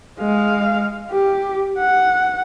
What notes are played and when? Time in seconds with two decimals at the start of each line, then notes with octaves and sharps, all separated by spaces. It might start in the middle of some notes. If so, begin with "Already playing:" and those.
0.19 G#3 F5
1.11 G4
1.79 F#5